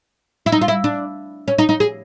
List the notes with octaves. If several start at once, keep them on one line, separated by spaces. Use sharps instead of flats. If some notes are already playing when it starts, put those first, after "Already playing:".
E4
D#4
F4
E4
D4
C#4
D#4
D#4
G#4